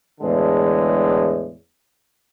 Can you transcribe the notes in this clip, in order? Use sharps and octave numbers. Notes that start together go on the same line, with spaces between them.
E2 A2 D3 G#3